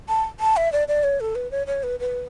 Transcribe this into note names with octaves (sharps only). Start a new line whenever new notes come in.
A5
A5
E5
D5
D5
C#5
A4
B4
C#5
C#5
B4
B4